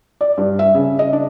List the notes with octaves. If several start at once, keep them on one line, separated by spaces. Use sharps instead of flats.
D5
G2
E5
C#3
D#5
D4